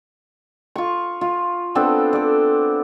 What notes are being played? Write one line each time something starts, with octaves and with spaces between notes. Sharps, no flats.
F4 C#6
F4
B3 C4 D4 A4
A4 D5